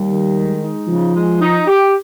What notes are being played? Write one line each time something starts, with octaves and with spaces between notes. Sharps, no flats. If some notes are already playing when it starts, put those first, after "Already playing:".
Already playing: D#2 G3
D#3
G#3
D#4
C#3 F3
G#3
D#4
G4